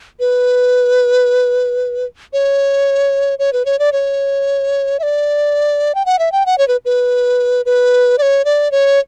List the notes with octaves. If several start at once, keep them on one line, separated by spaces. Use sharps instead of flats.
B4
C#5
C#5
B4
C#5
D5
C#5
E5
D5
G5
F#5
E5
G5
F#5
C#5
B4
B4
B4
D5
C#5
D5
C#5